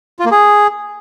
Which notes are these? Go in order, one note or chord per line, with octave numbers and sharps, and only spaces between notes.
F4
A#3
G#4